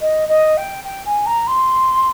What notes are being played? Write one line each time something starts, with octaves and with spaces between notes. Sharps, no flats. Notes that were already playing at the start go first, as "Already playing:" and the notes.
D#5
D#5
G5
G5
G#5
A#5
C6